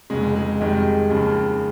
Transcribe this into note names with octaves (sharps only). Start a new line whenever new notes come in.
F1 F2 C#3 G#3
G#3
F2 C3 D#3 G3 G#3
D#2 C#3 F3